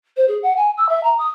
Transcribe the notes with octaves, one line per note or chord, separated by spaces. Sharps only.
C5
G#4
F#5
G#5
E6
E5
A#5
D#6